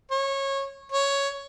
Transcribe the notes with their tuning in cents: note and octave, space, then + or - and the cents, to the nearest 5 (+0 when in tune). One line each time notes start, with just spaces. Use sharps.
C#5 -20
C#5 +5